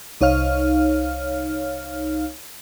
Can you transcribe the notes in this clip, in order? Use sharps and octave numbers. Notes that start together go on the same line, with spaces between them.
C2 D#4 C#5 F5 F6